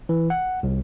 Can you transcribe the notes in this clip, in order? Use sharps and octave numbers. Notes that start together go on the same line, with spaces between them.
E3
F#5
C2